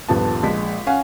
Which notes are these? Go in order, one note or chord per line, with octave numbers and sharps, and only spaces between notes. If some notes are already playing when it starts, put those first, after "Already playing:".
D#1 G2 F3 B3 A5
A#1 G#3 B6
C#4 F5 F#5 G#5